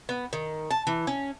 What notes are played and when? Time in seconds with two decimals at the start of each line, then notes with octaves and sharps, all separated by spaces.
0.09 B3
0.33 D#3
0.71 A5
0.87 E3
1.07 C#4